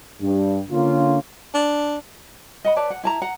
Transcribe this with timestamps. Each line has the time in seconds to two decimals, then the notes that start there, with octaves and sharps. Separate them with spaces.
0.22 G2
0.71 D3 A#3 C#4 F4
1.54 D4
2.65 D#5 F#5 B5
2.76 B4 C#5 D5 A5
2.90 F#5
3.04 E4 A5 A#5
3.22 F#5 A#5